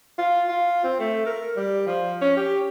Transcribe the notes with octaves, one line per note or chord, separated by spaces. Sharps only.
F4
F4
C4
A3
A#4
G3
F3
C#4
G4